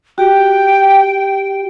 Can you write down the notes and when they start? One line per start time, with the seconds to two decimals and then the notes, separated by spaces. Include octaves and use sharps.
0.18 F#4 G4 G5